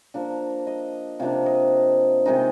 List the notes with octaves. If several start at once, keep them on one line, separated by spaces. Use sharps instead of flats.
F3 A#3 D4 A#4
D#5
C3 F3 A#3 D4 F5
D#5
C3 D#3 G#3 D#4 D#5